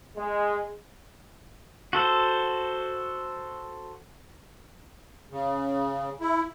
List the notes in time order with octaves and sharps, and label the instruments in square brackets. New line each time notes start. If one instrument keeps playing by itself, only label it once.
[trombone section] G#3
[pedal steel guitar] F#4 A4 C5
[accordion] C#3
E4